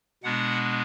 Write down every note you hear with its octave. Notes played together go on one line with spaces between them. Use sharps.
B2 G#3 B3 D4 F#5